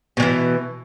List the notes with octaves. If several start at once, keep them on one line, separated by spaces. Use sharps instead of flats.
B2 E3 G#3